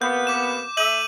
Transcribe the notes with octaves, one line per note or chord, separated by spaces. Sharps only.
C3 A#3 B3 G6
D6 E7
A3 E5 G6 D#7 F#7